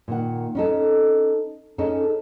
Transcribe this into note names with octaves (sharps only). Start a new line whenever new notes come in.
A#2 D#3 F#5
C#4 D#4 A4
C#4 D#4 G#4 A4